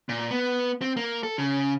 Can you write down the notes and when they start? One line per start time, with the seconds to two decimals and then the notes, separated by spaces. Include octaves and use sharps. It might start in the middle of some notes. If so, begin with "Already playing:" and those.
0.09 A#2
0.31 B3
0.82 C4
0.97 A#3
1.23 A4
1.38 C#3